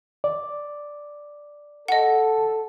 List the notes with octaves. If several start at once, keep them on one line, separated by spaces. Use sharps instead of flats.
D5
A4 D#5 F#5